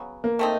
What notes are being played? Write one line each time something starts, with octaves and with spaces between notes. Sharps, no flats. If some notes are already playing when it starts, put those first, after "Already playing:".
Already playing: C#3 F#3 B3
A#3
A3 C4 D#4